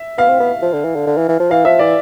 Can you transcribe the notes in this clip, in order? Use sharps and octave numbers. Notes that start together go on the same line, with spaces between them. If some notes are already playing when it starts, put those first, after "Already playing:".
Already playing: E5
B3 F5
C4
B3
F3
D3
E3
D3
D3
E3
E3
F3
E3 F5
F3 E5
E3 D5